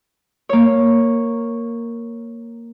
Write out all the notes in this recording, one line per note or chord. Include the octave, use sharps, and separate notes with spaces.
A#3 C#5